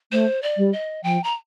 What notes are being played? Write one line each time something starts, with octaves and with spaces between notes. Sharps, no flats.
A3 C5
D5
G3
D#5
F3 G5
A#5